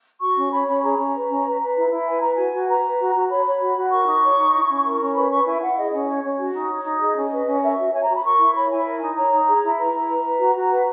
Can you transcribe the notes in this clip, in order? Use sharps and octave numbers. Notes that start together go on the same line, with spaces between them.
F#4 C#6
C#4
C#5 B5
C#4 B5
G#4 A#5
C#4
B4
C#4
B4
B4
E4
E4
B4 G#5
B4 A#5
F#4 G#5
F#4
B4 A#5
B4
F#4
F#4
C#5 B5
C#5
F#4
F#4
A#4 C#6
D#4
C#5
D#4
E4
C#4
A#4
C#4
B4 B5
B4 C#6
E4 G#5
E4 F#5
G#4 D#5
C#4 D#5
C#5
C#4
F#4
D#4
C#5
D#4
G#4 D#5
C#4
B4
C#4
A#4 E5
F#4
C#5 G#5
A#5
F#4
B5
A#4 C#6
E4
C#5 B5
E4 G#5
A#4
D#4
C#5 A#5
D#4
G#4
E4
B4 A#5
E4
B4
B4
F#4
F#4
B4